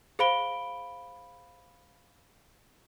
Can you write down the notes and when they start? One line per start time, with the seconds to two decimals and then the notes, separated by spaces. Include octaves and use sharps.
0.19 G#4 C5 F5 B5 D7 G7